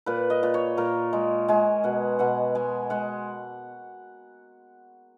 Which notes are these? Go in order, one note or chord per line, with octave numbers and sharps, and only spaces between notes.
A#2 B4
D#5
A#2
C#5
A#2 A#4
G#3
G#3 G#5
B2 F#5
B2 F#5
G#3 G#5
G#3 F#5